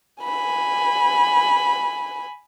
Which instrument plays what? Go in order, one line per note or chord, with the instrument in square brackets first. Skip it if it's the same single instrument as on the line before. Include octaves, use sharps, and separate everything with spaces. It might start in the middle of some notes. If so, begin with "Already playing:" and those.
[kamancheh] G#5 B5